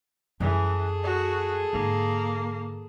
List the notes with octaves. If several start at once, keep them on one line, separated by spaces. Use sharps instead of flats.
F#2 E3 G3 G#4 A4
F#4
G#2 D3 A#3